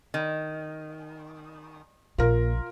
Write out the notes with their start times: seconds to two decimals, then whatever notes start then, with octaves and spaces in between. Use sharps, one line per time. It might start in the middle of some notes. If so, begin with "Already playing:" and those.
0.14 D#3
2.18 A#1 A#2 F4 A#4